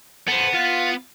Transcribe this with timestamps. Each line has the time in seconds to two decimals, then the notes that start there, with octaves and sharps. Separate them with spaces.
0.28 B3 A4 C5
0.54 F4